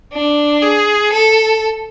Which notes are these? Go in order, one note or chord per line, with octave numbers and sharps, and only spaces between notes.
D4
G#4
A4